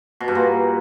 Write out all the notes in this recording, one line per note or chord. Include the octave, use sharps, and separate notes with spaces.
B2
G2
A#2